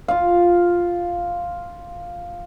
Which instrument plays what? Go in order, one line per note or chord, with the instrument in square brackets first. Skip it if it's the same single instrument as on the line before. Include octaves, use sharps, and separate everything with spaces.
[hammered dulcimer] F4 F5